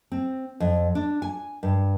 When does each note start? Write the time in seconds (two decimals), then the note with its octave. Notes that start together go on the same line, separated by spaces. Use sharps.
0.12 C4
0.60 F2
0.95 D4
1.22 G#5
1.63 G2